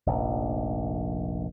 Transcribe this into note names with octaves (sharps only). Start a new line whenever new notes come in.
F1 A#1